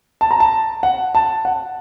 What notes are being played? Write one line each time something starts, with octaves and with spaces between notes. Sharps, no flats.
A5
A#5
A5
F#5
A5
F#5